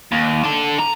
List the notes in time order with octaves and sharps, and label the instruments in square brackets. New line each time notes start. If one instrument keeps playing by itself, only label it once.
[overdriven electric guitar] D#2
D4 A4
A#5